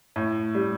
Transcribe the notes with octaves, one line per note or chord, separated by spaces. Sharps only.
A2
G3